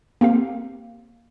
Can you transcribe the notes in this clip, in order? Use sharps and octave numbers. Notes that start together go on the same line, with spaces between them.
A#3 C4 G4 F5